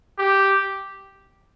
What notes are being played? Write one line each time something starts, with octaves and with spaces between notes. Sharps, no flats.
G4